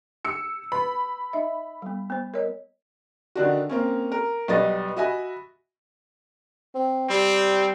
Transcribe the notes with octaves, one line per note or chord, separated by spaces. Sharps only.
E6 C#7
B4 B5
D#4 D#5 E5
G3 B3
B3 C5
A#4 C#5 D#5
D3 D#3 D4 F#4
A#3 C4 C#4
A#4
B1 G3 B3 D#5 B5 A6
F#4 D#5 E5 G#5 B5
C4
G3 C4